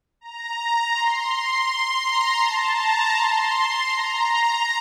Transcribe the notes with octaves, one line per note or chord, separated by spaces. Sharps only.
A#5
C6
C6
A#5
A5
A#5
C6
A#5